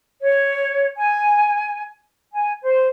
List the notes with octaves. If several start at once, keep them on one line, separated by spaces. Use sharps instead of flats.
C#5
G#5
G#5
C5